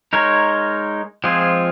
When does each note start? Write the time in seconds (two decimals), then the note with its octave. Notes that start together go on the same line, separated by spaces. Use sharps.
0.13 G#3 D#4 A#4 C#5
1.24 F3 G#3 C4 F4 G#4